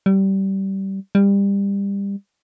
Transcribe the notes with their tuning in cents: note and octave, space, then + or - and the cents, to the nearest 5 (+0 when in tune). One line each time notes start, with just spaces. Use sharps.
G3 -20
G3 +25